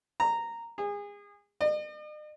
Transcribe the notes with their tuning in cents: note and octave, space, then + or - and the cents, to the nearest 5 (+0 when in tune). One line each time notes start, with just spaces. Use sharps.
A#5 -10
G#4 -30
D#5 -45